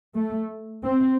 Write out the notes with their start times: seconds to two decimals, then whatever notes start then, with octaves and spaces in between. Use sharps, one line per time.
0.15 A3
0.84 C4